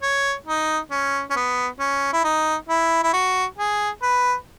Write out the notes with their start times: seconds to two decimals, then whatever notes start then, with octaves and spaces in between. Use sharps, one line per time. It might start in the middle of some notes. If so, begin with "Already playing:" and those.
0.02 C#5
0.47 D#4
0.91 C#4
1.30 C#4
1.36 B3
1.80 C#4
2.13 E4
2.24 D#4
2.69 E4
3.03 E4
3.13 F#4
3.58 G#4
4.03 B4